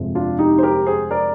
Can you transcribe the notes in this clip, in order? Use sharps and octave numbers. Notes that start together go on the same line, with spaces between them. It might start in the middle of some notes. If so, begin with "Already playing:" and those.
Already playing: G1 F2 C3 F3 G#3
D4 F4
D#4 G4
C5
G4 A#4
G#4 C5
A#4 D5